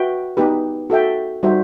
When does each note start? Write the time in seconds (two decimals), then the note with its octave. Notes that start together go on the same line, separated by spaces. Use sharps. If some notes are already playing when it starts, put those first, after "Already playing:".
Already playing: F#4 B4 E5 G5
0.37 B3 D#4 G4 B4
0.90 F#4 A4 E5 G5
1.43 G3 D#4 F#4 C5 E5